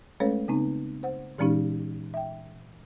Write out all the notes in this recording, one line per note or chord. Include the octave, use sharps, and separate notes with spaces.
G#3 A3 C#4 A4 B4 C#5
C#3 B3 C4 D#4
C5 F#5
A#2 E3 G#3 C#4 D#4 G4
E5 G5